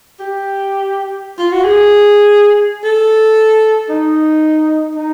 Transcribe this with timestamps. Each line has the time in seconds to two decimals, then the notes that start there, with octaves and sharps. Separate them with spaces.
0.20 G4
1.38 F4
1.52 F#4
1.64 G#4
2.85 A4
3.89 D#4
4.95 D#4